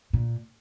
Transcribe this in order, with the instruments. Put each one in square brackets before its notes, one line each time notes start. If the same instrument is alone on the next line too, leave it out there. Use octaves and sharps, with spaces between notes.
[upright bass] A#2